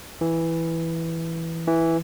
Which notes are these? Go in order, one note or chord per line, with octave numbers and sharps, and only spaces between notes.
E3
E3